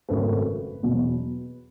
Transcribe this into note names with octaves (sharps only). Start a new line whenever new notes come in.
G#1 F#2 C#3 F#3 A3 B4
E2 B2 F#3